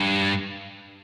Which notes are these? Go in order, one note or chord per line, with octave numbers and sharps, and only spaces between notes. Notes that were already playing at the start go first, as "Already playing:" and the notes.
Already playing: G2